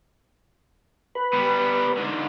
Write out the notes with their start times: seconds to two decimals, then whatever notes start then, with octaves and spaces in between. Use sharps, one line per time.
1.15 B4
1.33 G3 B3
1.97 G#2 D3